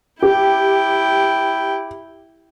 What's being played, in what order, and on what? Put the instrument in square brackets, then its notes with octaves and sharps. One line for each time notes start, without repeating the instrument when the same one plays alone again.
[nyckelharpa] E4 G5 [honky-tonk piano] G4